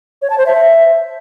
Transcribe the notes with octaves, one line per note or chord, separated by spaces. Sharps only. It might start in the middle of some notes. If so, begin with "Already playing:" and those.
C#5
A5
C5
E5